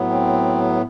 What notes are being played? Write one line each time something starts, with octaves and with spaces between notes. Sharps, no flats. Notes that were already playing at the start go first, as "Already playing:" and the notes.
Already playing: A2 F#3 B3
C4